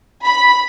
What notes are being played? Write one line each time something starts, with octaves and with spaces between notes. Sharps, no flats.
B5